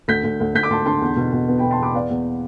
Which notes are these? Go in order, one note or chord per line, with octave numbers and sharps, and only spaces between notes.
D2 G6 B6
D2
D2
D2 G6 B6
D6
D2 A5 C6
D3 A5 C6
E2
B2
B2
B3
B2 G5 B5
A5 C6
E2 B5 D6
B3 D5 F5
E2